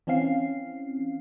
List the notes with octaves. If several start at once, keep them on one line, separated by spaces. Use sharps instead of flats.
E3 C4 C#4 F5 C7